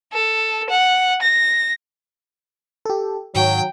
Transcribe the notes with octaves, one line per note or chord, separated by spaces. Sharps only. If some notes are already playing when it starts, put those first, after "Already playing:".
A4
F#5
A#6
G4 A4
G#2 D#3 F#3 G5